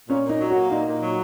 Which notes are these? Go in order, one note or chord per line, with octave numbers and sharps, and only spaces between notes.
A#2 C#4
A#2
D#4
F#3
F#4
A#3
A#2 D#4
A#2
F#3